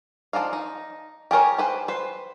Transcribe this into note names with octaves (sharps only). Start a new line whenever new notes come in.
F3 C4 D4 D#4 F5
D#4
G4 G#4 A#4 C#5
G4 B4 C5
B4 C5